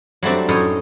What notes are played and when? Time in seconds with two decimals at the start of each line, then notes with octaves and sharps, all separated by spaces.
0.23 F#3 G3 A3 C4 D4
0.48 F#2 A2 C#5 D#5 G5